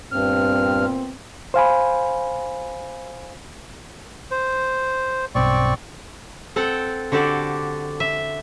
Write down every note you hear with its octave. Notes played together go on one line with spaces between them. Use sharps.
G2 A#2 B3 C4 F6
C5 F5 G#5 B5
C5
B1 G2 B2 C4 D5 C#6
C4 A4 F#5 G5 A5
D3 F#4 G4 A4 D5
E5